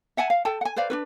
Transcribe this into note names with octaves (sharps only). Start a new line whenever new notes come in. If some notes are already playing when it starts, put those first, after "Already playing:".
E5 F#5 G#5 A5
F5
A4 G5 A5
F#5 G#5
B4 C5 D5 F5
D4 F4 B4